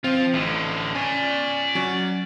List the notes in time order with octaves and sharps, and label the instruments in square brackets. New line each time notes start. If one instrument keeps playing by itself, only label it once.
[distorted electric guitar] F3 F4 [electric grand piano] C4
[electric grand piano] A1 [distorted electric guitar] A2 D3
[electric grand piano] C#4 [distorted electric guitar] D5 G#5
[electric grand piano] F#3 C#4